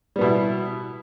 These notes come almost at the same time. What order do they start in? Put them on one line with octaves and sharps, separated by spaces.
G3 B3 B2 E4